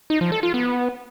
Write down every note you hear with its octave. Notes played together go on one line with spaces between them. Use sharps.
D#4
F3
A4
F4
B3